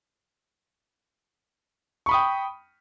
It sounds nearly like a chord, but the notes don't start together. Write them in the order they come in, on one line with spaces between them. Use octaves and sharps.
C#6 B5 D#6 G5